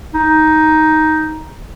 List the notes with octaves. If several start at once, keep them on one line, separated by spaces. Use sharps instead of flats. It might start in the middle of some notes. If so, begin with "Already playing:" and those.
D#4